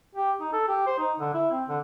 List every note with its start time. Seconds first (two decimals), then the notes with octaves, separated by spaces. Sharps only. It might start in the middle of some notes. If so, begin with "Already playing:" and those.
0.15 G4
0.40 D#4
0.53 A4
0.68 G4
0.86 C5
0.98 D#4
1.19 D3
1.34 E4
1.51 C4
1.68 D3